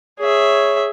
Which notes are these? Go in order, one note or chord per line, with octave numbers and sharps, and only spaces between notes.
G#4 C#5 E5